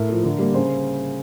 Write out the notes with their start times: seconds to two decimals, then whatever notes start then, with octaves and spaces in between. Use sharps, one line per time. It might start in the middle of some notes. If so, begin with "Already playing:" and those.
Already playing: A2 A#4
0.09 F3 A3
0.24 D3
0.38 G3 A#3
0.54 C#3 C5